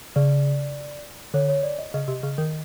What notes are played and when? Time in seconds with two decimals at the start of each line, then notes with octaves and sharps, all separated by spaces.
0.16 C#3 D5
1.34 D3 C#5
1.49 C#5
1.63 D5
1.79 D#5
1.94 C#3 D#5
2.08 C3
2.23 C#3
2.38 D#3